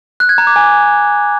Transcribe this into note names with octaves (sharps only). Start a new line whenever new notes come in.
F#6
G#6
A#5
D6
G#5